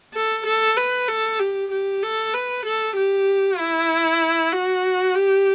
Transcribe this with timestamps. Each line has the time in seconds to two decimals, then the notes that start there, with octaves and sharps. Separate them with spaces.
0.14 A4
0.46 A4
0.77 B4
1.08 A4
1.40 G4
1.71 G4
2.03 A4
2.34 B4
2.65 A4
2.96 G4
3.59 E4
4.53 F#4
5.15 G4